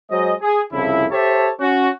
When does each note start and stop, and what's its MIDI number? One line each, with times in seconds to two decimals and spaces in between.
0.11 0.33 54
0.11 0.33 56
0.11 0.33 72
0.11 0.33 75
0.42 0.61 68
0.72 1.06 36
0.72 1.06 41
0.72 1.06 49
0.72 1.06 64
1.11 1.49 67
1.11 1.49 69
1.11 1.49 72
1.11 1.49 73
1.11 1.49 76
1.11 1.49 81
1.60 1.89 61
1.60 1.89 66